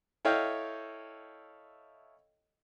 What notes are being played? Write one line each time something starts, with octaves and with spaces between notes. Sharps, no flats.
E4 A4 C#5 D#5 F5 G5